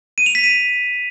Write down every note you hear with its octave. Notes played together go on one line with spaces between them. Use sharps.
D#7
F7
B6
D#7